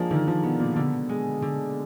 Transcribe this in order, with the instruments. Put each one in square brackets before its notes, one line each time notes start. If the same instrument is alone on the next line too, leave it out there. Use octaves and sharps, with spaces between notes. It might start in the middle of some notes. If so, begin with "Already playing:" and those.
Already playing: [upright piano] F3 A#3 D4 [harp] G#3
[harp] D3 [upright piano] D#3
[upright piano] F3
[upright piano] B2 [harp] B3
[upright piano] A#2
[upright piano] B2 [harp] D3
[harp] G#3
D3